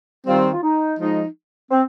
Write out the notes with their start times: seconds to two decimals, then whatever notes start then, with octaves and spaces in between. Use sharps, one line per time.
0.27 D#3 G3 C4 F4
0.53 F4
0.63 D#4
0.99 F3 G#3 D#4
1.71 C4